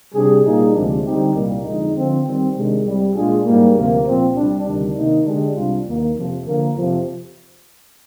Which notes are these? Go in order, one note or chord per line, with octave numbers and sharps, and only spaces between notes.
C3 G3 D4 G#4
A#2 G3 A#3 D#4 G#4
D2 C3 F3 G#3 D4
D3 G3 C4 D#4 G4
C2 A#2 G3 A#3
F2 D3 G#3 D#4
D3 F3 C4
D#3 G3 C4
C3 D#3 G#3 D4
C2 C3 G3
A#2 G#3 D4 F4 G#4
G#2 G3 A#3
D2 C3 F3 A#3
A#2 F3 C4
C2 C3 G3 D4
D2 C3 D#3 G3 D4
C3 D#3 A#3 D#4
D3 G#3 D4 G4
C2 C3 G3 D4 F4
D#2 D#3 A#3
F2 C3 F3
D3 F3 A#3
F2 C3 F3